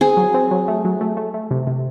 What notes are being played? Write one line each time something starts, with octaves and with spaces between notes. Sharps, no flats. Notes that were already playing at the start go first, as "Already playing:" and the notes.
C4 G#4
F#3
C4
F#3
A3
F#3
A3
A3
A3
C3
C3